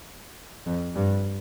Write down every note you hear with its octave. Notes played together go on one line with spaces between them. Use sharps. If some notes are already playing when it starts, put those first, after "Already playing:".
F2
G2